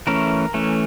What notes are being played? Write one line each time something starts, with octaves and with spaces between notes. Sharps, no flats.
E3 A3 C#4 A#4
E3 A3 C#4